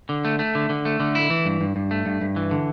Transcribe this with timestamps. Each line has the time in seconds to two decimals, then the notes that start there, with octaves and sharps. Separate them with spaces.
0.09 D3
0.25 A3
0.39 A3
0.55 D3
0.69 D3
0.85 A3
1.00 D3
1.15 E4
1.30 E3
1.46 G2
1.61 G2
1.76 G2
1.91 A3
2.06 G2
2.21 G2
2.36 E3
2.51 D3